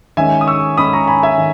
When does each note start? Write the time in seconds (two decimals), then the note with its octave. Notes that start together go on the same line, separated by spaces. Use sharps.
0.17 D#3 G#3 C#4 E5 G#5
0.41 D#6
0.47 C#6 E6
0.77 D#3 G#3 C#4 B5 D#6
0.93 A#5 C#6
1.07 G#5 B5
1.23 E5 G#5
1.38 D#3